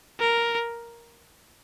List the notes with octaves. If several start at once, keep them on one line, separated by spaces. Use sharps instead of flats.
A#4